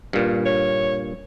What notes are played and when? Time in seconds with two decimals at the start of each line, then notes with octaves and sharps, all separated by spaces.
0.13 G2 A#2
0.46 C#5